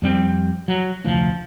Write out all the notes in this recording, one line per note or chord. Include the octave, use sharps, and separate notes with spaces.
F2 G3 C4
F#3
F1 D2 F3